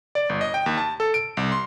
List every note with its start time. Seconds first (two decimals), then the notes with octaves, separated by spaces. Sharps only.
0.15 D5
0.29 G1
0.41 D#5
0.54 G5
0.66 D#2
0.78 A5
1.00 A4
1.14 D7
1.37 C2
1.52 C6